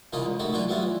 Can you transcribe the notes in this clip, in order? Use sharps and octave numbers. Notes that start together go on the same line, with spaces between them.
C2 C#3 E3 A#3 F4 D#5
C#2
B2 D#3 A3 B3 F#4
D3 E3 F#3 D4 F4 B4
F#3 G3 A3 B3 E4 F4
E3